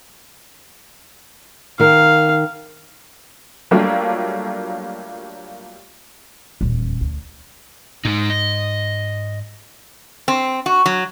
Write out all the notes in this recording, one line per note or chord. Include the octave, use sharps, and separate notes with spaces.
D#3 A#4 F5
F#3 G3 A3 A#3 D4 F4
D#1 E2
D2
G#2 G#3 D#4
D#5
C4
F#4
F#3